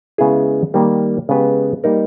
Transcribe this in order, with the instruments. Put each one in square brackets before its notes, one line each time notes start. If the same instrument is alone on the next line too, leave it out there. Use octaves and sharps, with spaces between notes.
[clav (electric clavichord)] C#3 G#3 B3 E4 G#4
D#3 G3 A#3
C#3 G#3 B3 G4 B4
G3 A#3 D#4 A#4